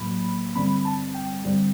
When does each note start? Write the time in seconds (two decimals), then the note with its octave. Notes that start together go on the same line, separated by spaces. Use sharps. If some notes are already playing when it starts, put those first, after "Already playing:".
Already playing: A2 F#3 A#3 B5
0.55 G2 D3 G3 C4 B5
0.85 A5
1.14 G5
1.44 G2 D3 G3 C4